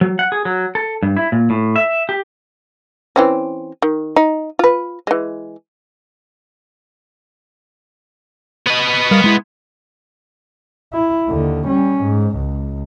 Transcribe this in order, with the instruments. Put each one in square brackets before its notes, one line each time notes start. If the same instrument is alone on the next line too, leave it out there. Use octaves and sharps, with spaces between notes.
[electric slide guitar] F#3
F#5
G#4
F#3
A4
G2
E4
A#2
A2
E5
G4
[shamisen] E3 C4 C#4
D#3
D#4
F4 B4
E3 G#3
[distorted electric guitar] B3 D#5
[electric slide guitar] G3 A#4 F5
G#3 E4
[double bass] E4
D#2 D3
G3 C#4
G#2
C#2